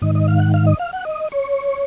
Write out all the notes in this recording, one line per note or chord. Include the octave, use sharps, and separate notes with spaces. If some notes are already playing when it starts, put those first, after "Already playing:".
G#2 D#3 D#5
D#5
F5
F#5
F5
D#5
F5
F#5
D#5
C#5